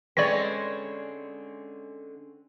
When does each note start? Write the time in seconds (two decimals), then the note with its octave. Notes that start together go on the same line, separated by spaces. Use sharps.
0.17 D3 G#3 C4 C#4 B4 C#5 D5 A#6